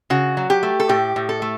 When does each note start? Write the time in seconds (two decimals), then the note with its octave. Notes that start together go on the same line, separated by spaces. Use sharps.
0.10 C#3 F#4
0.37 F#3
0.50 G4
0.63 A3
0.80 A4
0.89 A2 G4
1.16 A2
1.29 A4
1.42 A3